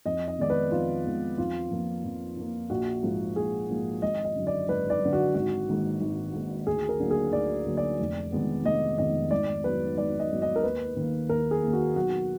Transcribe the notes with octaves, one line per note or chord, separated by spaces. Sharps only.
F2 D#5
D#5
D#3 G#3 B3 D5
B4
F2 F4
D#3 G#3 B3
F2 F4
F3 A#3
F2
F3 A#3
A#1 F#4
G#2 F3 A#3
A#1 G#4
G#2 F3 A#3
G#1 D#5
D#5
F#2 D3
D5
G#1 B4
D5
F#2 D3
F#4
G#1 F#4
G#2 D#3 A#3
G#1
G#2 D#3 A#3
D2 G#4
A#4
D3 F#3 A#3
G#4
D2 D5
D3 F#3 A#3
D5
F1
F2 D#3 G#3 B3
F1 D#5
F2 D#3 G#3 B3 D#5
G#1 D5
G#2 F#3 B3 B4
G#1 D5
D#5
G#2 F#3 B3
D#5
A#4
D#2 B4
D#3 A#3
D#2 A#4
G#4
D#3 A#3
F#4
B1 F#4